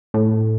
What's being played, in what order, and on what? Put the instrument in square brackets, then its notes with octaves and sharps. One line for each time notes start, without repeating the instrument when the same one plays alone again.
[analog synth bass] A2